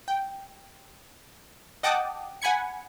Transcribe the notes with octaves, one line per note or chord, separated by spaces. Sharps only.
G5
D#5 F#5 G5 A5 D6 D#6
F#5 G#5 B5 G#6 C#7